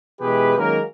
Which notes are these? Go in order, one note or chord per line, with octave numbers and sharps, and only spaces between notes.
B2 E3 G#3 G4 G#4 B4
D#3 F#3 G#3 A#3 C#4 A#4